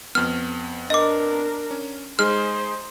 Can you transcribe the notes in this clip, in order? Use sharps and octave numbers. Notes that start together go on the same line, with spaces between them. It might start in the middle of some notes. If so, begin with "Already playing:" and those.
F2 B3 F6
D4 A#4 D#5 D6
C#4
G#3 D#4 G#4 C5 F6